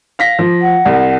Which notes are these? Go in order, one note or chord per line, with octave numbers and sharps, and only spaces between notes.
F5 A#6 B6
F3
F#5
C2